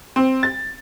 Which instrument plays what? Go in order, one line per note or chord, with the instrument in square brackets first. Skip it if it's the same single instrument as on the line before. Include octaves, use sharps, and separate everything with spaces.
[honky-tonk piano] C4
A6